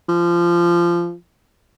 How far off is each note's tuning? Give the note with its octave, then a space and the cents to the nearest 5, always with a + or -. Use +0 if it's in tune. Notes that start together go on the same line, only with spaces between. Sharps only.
F3 -20